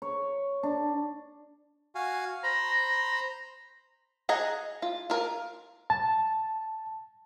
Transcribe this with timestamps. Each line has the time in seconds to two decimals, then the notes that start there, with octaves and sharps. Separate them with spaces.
0.02 C#5
0.63 D4
1.95 F#4 F5 G#5
2.43 C5 A#5 B5 A#6
4.29 G#4 D#5 F#5 G#5 A#5
4.82 F4
5.10 F4 A#4
5.90 A5